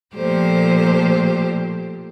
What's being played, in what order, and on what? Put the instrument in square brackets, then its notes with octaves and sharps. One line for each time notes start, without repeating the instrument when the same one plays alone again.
[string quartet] A#2 F3 A3 G4 C5